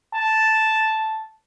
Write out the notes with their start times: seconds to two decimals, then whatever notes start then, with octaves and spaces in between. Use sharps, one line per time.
0.14 A5